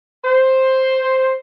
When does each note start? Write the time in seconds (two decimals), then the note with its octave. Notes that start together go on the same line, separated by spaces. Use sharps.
0.25 C5